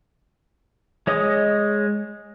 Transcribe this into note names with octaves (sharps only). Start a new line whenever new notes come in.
G#3 C#5 D#5 D#6